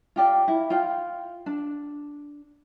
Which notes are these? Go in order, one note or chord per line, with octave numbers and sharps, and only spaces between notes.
F4 G4 D5
E4
F4 G5
D4